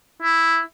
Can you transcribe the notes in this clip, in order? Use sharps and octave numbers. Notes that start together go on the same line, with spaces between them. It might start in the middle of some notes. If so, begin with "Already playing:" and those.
E4